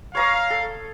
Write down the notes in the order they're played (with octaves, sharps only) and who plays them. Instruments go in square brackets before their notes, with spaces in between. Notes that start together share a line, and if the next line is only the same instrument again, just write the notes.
[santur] C#5 A#5 D#6 [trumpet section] F5
[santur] A4